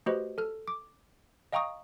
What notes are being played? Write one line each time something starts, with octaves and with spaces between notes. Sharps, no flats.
A3 F#4 G4 B4 C5 D#5
A4 F6
D6
D#5 F5 G5 A#5 C#6 D#6